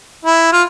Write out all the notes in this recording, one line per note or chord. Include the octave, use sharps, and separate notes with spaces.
E4
F4